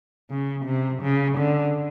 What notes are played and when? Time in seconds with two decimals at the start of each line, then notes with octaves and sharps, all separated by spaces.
0.30 C#3
0.65 C3
1.02 C#3
1.38 D3